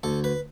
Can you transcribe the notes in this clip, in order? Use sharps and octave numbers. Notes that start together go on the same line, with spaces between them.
D2 A4
B4